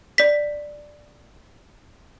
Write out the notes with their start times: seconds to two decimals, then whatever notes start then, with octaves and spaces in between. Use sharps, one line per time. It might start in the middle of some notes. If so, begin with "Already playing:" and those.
0.18 D5 B6